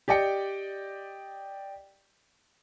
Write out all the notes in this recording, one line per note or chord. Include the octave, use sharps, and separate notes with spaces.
G4 D5 D#5 G5 C#7